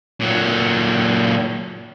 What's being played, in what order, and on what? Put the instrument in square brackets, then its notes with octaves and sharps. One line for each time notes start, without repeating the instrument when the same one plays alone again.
[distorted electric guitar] A#2 F#3